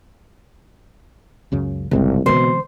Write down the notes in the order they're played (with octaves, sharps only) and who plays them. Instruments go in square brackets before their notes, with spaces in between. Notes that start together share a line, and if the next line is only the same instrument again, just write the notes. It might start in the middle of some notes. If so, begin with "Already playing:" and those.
[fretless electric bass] C#2 F#2 C#3
[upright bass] G1 [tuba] C2 [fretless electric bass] C#3 G#3 C4
[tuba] B2 [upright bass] D3 E3 [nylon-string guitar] C5